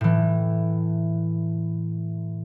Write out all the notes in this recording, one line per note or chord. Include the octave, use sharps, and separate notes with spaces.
A2 E3